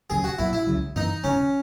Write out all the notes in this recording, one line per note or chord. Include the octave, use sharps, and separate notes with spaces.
E1 D#2 C#3 F#3 G#4
F#4
B1 A#2 F#3 E4
E4
C#2 C#3 F#3
F#2 E3 A#3 D#4
E1 E2 C#3 C#4